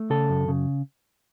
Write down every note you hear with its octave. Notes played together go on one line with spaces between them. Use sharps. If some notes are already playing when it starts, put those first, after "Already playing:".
Already playing: A3
C#3 A4
F#2
C#3